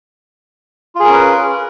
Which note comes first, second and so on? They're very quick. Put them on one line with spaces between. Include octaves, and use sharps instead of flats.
F4 G#4 A#4 C#4 B4